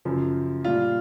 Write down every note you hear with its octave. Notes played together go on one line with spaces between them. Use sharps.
F#2 C#3 F3
A#2 G3 F4